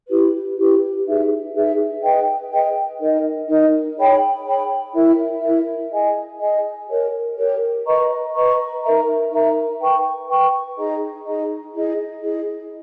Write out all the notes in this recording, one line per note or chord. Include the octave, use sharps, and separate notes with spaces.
E4 G4 B4
E4 G4 B4
D#4 G#4 B4 E5
D#4 G#4 B4 E5
G#4 B4 D#5 G5
G#4 B4 D#5 G5
D#4 A#4 D#5
D#4 A#4 D#5
G#4 C#5 G5 B5
G#4 C#5 G5 B5
E4 A#4 E5
E4 A#4 E5
G#4 D#5 G#5
G#4 D#5 G#5
G4 A#4 C#5
G4 A#4 C#5
B4 D#5 A#5 C#6
B4 D#5 A#5 C#6
D#4 A#4 E5 A#5
D#4 A#4 E5 A#5
B4 G5 C#6
B4 G5 C#6
D#4 G#4 D#5 A#5
D#4 G#4 D#5 A#5
E4 G#4 D#5
E4 G#4 D#5